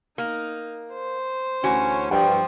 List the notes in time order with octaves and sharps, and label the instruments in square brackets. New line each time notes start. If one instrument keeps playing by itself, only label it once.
[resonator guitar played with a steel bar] A#3 [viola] D#4
[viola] C5
[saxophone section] D2 C#4 [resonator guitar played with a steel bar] E3 F#4
[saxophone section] G2 [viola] F3 [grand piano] G5